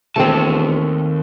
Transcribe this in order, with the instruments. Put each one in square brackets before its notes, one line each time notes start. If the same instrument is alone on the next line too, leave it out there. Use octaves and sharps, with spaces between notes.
[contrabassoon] E1 [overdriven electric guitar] D#2 A5 [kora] A3 C4